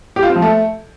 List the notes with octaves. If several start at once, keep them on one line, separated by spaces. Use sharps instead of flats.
G4
F4
C4
F3
A3